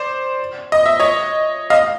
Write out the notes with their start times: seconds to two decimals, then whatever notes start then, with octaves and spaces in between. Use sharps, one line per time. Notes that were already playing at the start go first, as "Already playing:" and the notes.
Already playing: C5 D5
0.72 D#5
0.86 E5
1.00 C#5 D#5
1.70 D#5 F5